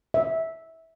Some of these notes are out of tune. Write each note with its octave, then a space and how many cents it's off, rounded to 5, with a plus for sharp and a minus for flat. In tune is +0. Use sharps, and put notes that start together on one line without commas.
E5 -20